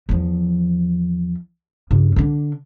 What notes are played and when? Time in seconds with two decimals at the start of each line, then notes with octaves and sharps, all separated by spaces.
0.09 E2 F3
1.91 G2 C#3
2.16 D3 D4